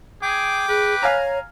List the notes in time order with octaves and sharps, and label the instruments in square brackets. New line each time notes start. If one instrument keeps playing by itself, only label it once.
[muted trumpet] G#4 [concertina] G5 D6
[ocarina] G#4 [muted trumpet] B4
[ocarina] C#5 [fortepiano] F5 G#5 A#5